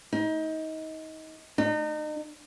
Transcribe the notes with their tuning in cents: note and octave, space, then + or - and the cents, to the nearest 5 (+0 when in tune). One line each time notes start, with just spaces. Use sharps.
D#4 +25
D#4 -35